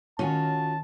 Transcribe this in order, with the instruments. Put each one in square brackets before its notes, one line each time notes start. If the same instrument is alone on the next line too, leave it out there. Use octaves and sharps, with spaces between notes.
[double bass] D#3 [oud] C#4 [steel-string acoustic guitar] F4 F#4 [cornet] A5